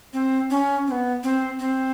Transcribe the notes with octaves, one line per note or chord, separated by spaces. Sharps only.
C4
C#4
C4
B3
C4
C4